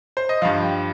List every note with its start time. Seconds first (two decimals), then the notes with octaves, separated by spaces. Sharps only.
0.17 C5
0.29 D#5
0.42 G2 F3 F5
0.62 G5